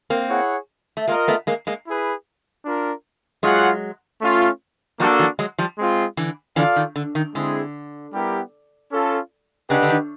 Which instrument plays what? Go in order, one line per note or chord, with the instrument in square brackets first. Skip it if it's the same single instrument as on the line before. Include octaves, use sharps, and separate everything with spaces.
[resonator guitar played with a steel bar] A#3 C4
[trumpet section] E4 G#4 C#5 F#5
[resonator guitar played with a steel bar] A3
[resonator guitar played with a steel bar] G#3 A#3 [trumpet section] F4 A#4 D#5
[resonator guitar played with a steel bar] A3 B3
G#3 A#3
G#3 A#3
[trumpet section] E4 G#4 B4
D4 F4 A#4
[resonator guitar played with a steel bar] F#3 G#3 [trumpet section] F4 G#4 C#5 F#5
[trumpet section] A3 C#4 F4
[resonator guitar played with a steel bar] F3 G3 [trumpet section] A#3 D4 F#4 A4
[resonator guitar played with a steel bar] E3 F#3
F#3 G#3
F3 G3
[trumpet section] G#3 C4 F4
[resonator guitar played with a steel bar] D3 E3
[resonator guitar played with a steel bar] D3 E3 [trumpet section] F4 A4 D5 F5
[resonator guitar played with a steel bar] D#3
D3
D#3
[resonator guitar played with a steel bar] D3 [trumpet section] G#3 C4 E4 G#4
[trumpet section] G3 B3 E4 G4 A#4
C#4 F4 A4
[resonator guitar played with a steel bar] C#3 [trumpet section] D4 G4 B4 D#5 F#5
[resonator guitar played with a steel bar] D3
D#3